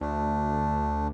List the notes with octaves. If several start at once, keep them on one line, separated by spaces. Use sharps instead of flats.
D2 A3 D4